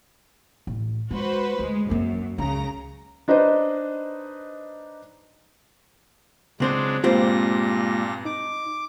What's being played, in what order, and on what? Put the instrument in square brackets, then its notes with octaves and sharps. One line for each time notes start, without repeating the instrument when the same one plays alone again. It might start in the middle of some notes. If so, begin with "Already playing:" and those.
[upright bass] A1
[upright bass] G#3 [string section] F#4 B4 C5
[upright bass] D2 [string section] G#3
[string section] F#2 [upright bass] A#3 C4
[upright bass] C#2 C#4 [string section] C#3 A#5
[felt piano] D4 D#4 B4 C5 D#5
[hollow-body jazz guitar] C#2 C4 C5 [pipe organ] F#3 G#3 D4
[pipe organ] G2 A#2 A#6 [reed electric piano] G#3 A#3 F4 [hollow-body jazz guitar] C4 G4
[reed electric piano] D#4 [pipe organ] D6